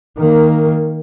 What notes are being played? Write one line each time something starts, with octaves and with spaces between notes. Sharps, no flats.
D#3 A#3